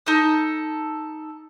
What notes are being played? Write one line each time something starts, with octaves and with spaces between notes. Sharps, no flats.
D#4 A4 D#6